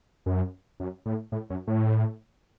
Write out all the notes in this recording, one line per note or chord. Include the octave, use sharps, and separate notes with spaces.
F#2
F#2
A2
A2
F#2
A2